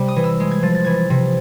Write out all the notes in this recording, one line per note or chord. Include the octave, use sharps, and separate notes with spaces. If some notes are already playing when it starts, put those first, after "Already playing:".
Already playing: C3 G3
D#6
E3
E6
G#3
G#6
F3 A6
A6
E3 G#6
A6
C3